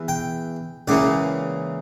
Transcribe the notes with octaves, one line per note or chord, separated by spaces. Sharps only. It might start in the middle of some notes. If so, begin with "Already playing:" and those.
Already playing: E2 E3
G5
C#2 C#3 E3 A#3 D5